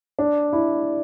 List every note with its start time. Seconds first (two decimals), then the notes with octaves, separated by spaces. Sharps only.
0.19 D4
0.53 E4